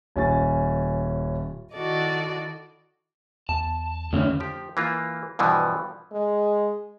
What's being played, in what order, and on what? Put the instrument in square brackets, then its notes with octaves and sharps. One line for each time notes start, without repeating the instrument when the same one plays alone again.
[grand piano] D#1 C#4 G#5 A6
[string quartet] D#3 E4 F#4 A4 D5 D#5
[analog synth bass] E2 [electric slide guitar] A5
[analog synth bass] F2 [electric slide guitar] A2 D3 C#4
[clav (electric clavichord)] F3 G4
E3 A#3 F4
G2 B2 E3 F3
[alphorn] G#3